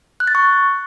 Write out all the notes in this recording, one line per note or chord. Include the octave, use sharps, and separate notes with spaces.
F#6
A6
C#6